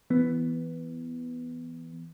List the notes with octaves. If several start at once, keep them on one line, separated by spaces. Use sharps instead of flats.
E3 B3